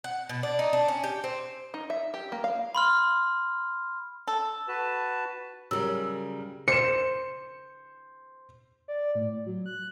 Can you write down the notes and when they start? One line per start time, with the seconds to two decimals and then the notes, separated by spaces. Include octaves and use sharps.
0.04 F#5
0.29 B2
0.43 D4
0.59 D#4
0.73 D4
0.88 C#4
1.03 G4
1.24 C4
1.74 D#4
1.90 E5
2.14 G4
2.32 A#3
2.44 F5
2.75 B5 C6 F6
4.28 A4
4.68 F#4 B4 A5
5.71 C#3 F#3 G3 A#4 C#5 E6
6.68 C5 C#7 E7
8.88 D5
9.15 A2
9.46 F#3
9.66 F#6